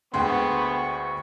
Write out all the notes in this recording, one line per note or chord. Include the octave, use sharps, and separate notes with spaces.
D2 D3 G#3 B3 G5 C6 C#6